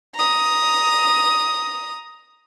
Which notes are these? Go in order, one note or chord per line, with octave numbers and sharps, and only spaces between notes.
A#5 D#6